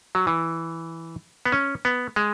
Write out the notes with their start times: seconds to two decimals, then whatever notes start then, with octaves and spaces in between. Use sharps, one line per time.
0.15 F#3
0.27 E3
1.45 B3
1.52 C#4
1.85 B3
2.16 G#3